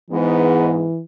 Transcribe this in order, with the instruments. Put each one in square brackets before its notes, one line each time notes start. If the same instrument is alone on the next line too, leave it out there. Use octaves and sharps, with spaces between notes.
[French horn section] G#2 B3 [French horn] E3